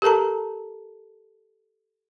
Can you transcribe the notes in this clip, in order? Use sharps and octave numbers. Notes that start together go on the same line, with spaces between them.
G4 A4 A#4 A5 A#5